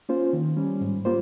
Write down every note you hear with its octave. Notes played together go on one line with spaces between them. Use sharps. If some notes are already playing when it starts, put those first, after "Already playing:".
A#3 C#4 F4 C5
D#3
G3 C#4
G#2
G3 A#3 F4 C5